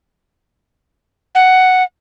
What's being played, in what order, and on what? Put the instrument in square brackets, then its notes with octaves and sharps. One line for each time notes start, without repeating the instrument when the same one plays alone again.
[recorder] F#5